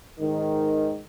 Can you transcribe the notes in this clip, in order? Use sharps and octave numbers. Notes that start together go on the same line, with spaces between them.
G#2 D#3